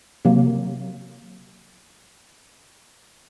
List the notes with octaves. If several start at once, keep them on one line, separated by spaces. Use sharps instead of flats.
C3 F#3 A#3